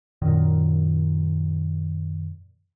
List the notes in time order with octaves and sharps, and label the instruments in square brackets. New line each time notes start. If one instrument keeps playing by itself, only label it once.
[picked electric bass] F#2 A#2 D#3